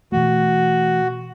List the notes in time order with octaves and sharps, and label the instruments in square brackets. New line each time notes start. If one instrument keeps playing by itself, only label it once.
[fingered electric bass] B2 E3 A3 [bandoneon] F#4